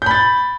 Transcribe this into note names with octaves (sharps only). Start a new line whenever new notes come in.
B5 G6 A6